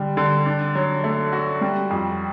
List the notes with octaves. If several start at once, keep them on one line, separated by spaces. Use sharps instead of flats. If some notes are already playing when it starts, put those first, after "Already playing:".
Already playing: D3 G3
D3
D4
F#3
A3
F#4
G3
F2